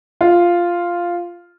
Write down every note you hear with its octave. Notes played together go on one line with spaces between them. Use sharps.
F4